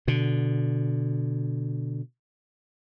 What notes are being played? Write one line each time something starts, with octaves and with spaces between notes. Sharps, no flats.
B2 D3